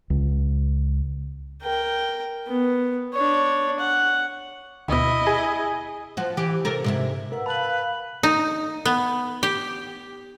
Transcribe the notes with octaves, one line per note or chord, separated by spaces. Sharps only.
C#2
A#4 G5
B3
D4 C#5
F#5
D2 B2 E4 D#5
G#4
F3 F#4
E3 G4
C3 A4 A#4
G#2 C3 E4
A#4 B4 F#5 E6
B4 F5 A5 B5 F#7
D#4
B3
G4